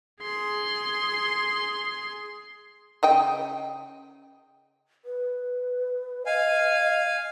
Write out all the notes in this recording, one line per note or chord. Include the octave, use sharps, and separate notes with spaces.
G#4 C6
C#3 D#5 G5
B4
D#5 F5 G#5